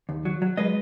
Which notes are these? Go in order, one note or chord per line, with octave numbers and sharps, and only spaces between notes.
D#2
F#3
F#3
G#3 B4 D#5